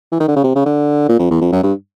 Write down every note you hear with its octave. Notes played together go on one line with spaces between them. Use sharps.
E3
D#3
D3
C#3
C3
C#3
D3
A#2
F2
E2
F2
F#2
G2